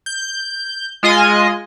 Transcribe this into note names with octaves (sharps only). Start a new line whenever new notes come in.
G6
G#3 F4 D#5 G#5